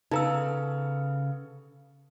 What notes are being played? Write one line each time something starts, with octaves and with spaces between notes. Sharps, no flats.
C#3 B3 D#4 A4 A#5 E6